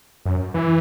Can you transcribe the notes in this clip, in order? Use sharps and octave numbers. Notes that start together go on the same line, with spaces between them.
F#2
E3